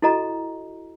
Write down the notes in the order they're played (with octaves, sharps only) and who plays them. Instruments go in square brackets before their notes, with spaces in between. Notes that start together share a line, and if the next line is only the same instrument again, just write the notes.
[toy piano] E4 F#4 A4 D#5 A#5